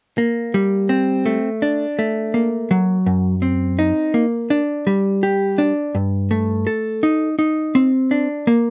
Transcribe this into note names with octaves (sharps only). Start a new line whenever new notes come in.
A#3
G3
C4
A3
D4
A3
A#3
F#3
F#2
C4
D#4
A#3
D4
G3
G4
D4
G2
A3
A4
D#4
D#4
C4
D4
A#3